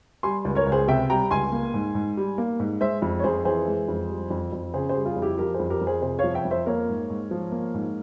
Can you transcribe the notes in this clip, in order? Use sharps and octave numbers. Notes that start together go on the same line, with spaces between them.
G3 G#5 C6
C#2
A#4 C#5
C#2
G#4 C5
C3 E5 G5
G3 G5 A#5
C#2 G#5 C6
A#3
G#2
G#2
G3
A#3
G#2
G#3 C5 E5
F2
C#5
F2 G#4 C5
E3 G#4 C5
G#3
F2
G3
F2
F2
C#3 G#4 C5
G#4 C5
G3
F4 G#4
F2
E4 G4
F3 G4 A#4
G#4 C5
F2
G4 A#4
F2
G#4 C5
C3 G#4 C5
F3 C#5 F5
E5 G5
F2
C5 E5
A#3 A#4 C#5
G#2
G#2
F3
A#3
G#2